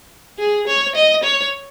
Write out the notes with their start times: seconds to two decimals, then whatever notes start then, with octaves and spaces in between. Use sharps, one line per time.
0.39 G#4
0.67 C#5
0.95 D#5
1.23 C#5